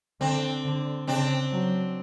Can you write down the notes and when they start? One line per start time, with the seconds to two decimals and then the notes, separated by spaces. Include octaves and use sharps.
0.20 D3 C4 D4
0.64 D3
1.07 C#3 C4 D4
1.52 F#3